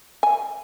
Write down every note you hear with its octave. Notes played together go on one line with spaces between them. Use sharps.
G#5